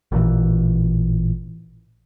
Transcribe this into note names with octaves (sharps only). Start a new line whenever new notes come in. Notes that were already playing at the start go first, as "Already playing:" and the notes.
A1 A#2 D3 E3